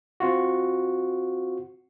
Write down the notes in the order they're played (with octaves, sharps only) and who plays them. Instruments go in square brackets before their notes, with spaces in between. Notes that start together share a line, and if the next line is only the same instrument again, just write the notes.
[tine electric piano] C4 F4 F#4